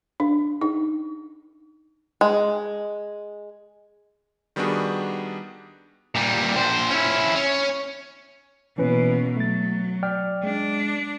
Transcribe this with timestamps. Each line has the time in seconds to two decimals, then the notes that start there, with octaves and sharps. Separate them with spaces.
0.20 D4
0.61 D#4
2.21 G#3
4.56 D#3 G3 B3 D4 F#4 G#4
6.15 A#2 G3
6.56 A#2 C5
6.90 C#4 E4
7.35 C#4
8.78 B2 E3 A#3 C#4 B4
9.36 F#3 A3 A6
10.03 D5 G5 F6
10.44 G#3 D4